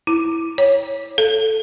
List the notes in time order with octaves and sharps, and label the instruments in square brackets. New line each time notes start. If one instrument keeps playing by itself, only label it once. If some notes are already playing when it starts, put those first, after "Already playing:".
[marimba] E4
C#5
A4